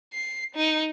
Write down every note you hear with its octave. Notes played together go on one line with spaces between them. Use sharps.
C7
D#4